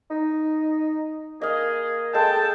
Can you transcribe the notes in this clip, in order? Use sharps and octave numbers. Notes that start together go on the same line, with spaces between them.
D#4
A#3 G#4 D#5 F5
G#3 G#4 A4 G5 A5